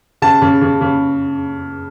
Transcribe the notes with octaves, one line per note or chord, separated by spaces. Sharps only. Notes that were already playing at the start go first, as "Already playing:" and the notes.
C#3 A5
C#3
C#3
C#3